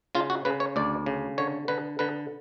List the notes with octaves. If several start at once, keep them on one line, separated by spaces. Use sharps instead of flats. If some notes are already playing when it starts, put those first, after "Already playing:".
C#3 F4
F#4
C#3 B4
C#5
D2 D5
C#3
D3 C#5
D3 B4
D3 B4